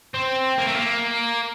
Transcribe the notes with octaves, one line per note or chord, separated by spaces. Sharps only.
C4
A#3
A3
A#3